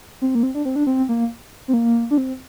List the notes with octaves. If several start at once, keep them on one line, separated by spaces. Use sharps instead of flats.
C4
A#3
C4
D4
C4
D4
C4
A#3
C4
A#3
D4
C4